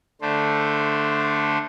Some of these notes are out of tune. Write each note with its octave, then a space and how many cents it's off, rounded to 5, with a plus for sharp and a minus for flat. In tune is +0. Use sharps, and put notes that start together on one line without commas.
D3 +0 A3 +0 C5 -5